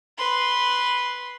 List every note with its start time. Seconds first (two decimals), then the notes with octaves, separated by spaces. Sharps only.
0.18 B4 C6